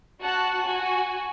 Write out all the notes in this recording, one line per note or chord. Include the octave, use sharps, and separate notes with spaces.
F#4 F#5 A5 F#6
F#4 G#5